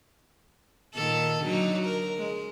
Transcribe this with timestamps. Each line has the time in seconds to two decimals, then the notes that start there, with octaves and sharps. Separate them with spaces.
0.94 A#2 D#3 A4
1.42 D3 F#3 D#4
1.85 A#4
2.17 G#3